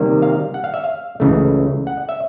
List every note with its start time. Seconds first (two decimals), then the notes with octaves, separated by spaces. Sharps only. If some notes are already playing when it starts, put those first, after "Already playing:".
Already playing: C3 D#3 G3 A#3
0.22 F5
0.54 F#5
0.64 F5
0.74 E5
0.84 F5
1.20 C#2 C#3 E3 A3
1.87 F#5
2.09 E5